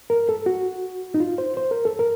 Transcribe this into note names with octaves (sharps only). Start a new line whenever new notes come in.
A#4
A4
F#4
D#4
F4
C5
C5
A#4
A4
A#4